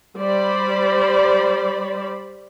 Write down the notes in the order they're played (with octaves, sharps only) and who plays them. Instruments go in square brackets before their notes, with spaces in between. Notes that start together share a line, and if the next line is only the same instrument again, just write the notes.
[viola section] G3 C5 D5 B5